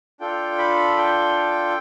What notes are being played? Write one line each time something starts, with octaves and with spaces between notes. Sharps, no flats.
D4 F4 A4 G5
B5
G5